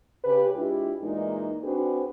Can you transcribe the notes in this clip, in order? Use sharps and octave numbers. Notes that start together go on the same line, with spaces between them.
C#3 G4 B4
G#3 D4 E4 F4 G4
A#2 E3 G#3 A#3 D#4
C4 D4 F#4 G#4 B4 C5